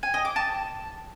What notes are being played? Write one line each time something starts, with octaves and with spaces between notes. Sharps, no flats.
G#5
D#5
D6
A5